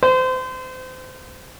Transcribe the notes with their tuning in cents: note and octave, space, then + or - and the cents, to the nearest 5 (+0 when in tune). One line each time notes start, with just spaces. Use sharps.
C5 -30